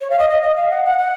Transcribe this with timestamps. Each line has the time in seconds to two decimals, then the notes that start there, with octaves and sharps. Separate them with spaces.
0.01 C#5
0.10 F5
0.19 D#5
0.29 D#5
0.42 D#5
0.56 F5
0.70 F#5
0.85 F#5
0.98 F#5